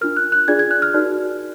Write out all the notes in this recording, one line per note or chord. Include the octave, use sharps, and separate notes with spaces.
D4 F4 A#4 F6
F#6
F#6
D4 F4 G#4 D5 G#6
G#6
F#6
F6
D#4 F#4 A#4 D5